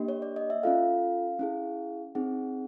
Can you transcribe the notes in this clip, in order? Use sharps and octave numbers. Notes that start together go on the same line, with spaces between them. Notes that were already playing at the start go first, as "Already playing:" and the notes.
Already playing: A#3 D4 G4 D#5
C#5
D5
D#5
E5
C#4 F4 A4 F5
C#4 E4 G#4
C4 D#4 G#4 F#5